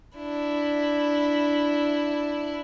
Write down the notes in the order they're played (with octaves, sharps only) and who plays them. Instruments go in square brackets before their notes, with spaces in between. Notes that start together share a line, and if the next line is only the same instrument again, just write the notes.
[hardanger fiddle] D4 E4